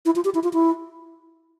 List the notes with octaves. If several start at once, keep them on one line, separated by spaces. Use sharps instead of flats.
E4
F4
G4
E4
F4
E4